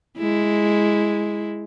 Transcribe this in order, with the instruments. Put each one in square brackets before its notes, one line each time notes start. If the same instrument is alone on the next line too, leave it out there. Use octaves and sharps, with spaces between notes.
[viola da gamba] G#3 E4